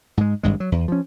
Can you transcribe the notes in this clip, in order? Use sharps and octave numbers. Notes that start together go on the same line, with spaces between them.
G#2 G#3
G#1 G2 G#3
F#3
E2
F3 C#4